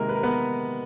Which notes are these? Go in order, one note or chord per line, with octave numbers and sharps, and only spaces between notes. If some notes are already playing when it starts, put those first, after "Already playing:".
Already playing: C3 D#3 G#3 A#3 A#4
B4
A#4
B3 B4